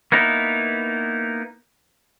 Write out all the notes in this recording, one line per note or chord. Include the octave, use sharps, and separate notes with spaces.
A#3 B3 D#4 E4